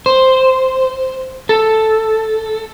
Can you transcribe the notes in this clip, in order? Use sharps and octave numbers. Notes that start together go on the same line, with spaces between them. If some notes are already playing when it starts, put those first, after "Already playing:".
C5
A4